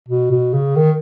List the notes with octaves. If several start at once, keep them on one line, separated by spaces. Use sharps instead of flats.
B2
B2
C#3
D#3